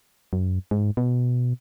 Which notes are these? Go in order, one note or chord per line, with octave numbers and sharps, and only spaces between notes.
F#2
G#2
B2